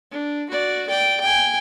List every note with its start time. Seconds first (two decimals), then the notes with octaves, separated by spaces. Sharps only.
0.11 D4
0.50 F#4 D5
0.88 D5 G5
1.21 G5 G#5